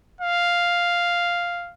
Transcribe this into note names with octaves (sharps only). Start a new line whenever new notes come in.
F5